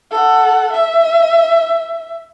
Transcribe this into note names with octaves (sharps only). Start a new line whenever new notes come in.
A4 F#5
E5